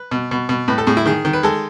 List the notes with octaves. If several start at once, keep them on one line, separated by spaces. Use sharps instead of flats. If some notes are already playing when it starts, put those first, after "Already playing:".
Already playing: B4
B2
B2
B2
A2 B4
A4
A2 G#4
E4
D#3 G#4
D#3
B4
G#3 A4